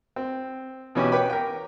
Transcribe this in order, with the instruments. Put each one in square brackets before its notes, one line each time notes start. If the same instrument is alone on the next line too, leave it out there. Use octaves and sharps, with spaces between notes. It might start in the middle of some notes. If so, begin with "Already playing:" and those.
[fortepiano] C4
B2 E3 C#4 F#4 G4
B4 C#5 G5 B5 D6
A#4 G5